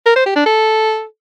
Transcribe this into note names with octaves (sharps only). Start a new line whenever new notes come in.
A#4
C5
G4
D4
A4